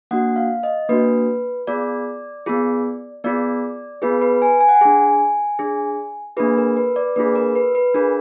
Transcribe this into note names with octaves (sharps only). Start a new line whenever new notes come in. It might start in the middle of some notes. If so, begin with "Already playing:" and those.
A#3 D4 F#4 F#5
F5
D#5
A#3 D4 F#4 B4
B3 F4 G#4 D5
B3 F4 G#4
B3 F4 G#4 D5
B3 F4 G#4 B4
B4
G#5
G#5
F#5
G#5
D4 G#4
D4 G#4
A#3 D4 F4 G#4 B4
A#4
B4
D5
A#3 D4 F4 G#4 B4
A#4
B4
B4
D4 F4 G#4 A#4